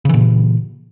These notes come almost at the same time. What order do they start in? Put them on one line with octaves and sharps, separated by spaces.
C#3 E3 A#2